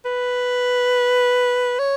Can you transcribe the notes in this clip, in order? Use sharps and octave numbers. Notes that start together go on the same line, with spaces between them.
B4
C#5